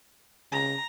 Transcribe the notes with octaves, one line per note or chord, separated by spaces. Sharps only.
C#3 A#5